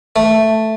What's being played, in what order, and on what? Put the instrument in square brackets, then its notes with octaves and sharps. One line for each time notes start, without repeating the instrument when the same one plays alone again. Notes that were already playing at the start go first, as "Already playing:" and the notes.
[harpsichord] A3